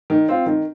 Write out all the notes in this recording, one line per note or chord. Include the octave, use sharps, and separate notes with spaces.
D#3
C4 F4
D#3